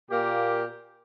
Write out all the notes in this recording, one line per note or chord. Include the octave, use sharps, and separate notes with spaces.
A#2 A#3 G4